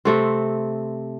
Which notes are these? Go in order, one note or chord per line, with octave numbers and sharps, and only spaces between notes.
C3 A3 C4